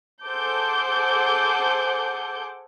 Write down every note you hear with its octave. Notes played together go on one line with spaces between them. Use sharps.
G#4 A4 C5 F#5 D6 G6